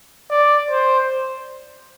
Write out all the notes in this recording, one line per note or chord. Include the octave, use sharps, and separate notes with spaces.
D5
C5